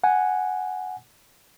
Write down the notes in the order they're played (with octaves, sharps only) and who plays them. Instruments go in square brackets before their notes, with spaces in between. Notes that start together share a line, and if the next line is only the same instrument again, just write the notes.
[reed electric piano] F#5 G#5